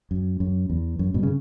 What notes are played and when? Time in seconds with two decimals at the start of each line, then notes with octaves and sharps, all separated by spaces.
0.11 F#2
0.40 F#2
0.70 E2
0.99 F#2
1.14 G2 B2
1.23 C#3